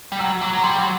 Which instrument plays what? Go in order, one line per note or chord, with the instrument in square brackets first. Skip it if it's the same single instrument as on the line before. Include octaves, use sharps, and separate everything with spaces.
[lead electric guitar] G3
[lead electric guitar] F#3 [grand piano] E6
[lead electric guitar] F#3 [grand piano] D6
[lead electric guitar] F#3
[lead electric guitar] G3 [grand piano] C6
[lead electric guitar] F#3